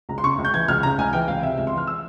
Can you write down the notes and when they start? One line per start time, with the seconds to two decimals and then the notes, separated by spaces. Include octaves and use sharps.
0.09 C#2 A#5
0.18 C6
0.23 C#3 C#6
0.38 C#2
0.45 G6
0.54 E3 G#6
0.68 C#2 F6
0.83 C#3 A#5
0.98 C#2 G#5
1.13 E3 G5
1.28 C#2 F5
1.43 C3 E5
1.58 C#2 E5
1.67 C6
1.72 E3
1.78 F6
1.87 E6